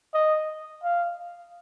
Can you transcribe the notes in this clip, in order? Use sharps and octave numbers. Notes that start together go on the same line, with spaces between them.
D#5
F5